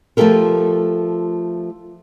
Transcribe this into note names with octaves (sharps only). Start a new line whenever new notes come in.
F3 A3 F4 G4 A4 A#4